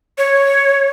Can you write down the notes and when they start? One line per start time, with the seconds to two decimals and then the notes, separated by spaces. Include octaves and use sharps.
0.18 C#5